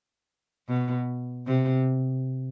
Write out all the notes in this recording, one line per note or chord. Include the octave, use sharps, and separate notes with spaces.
B2
C3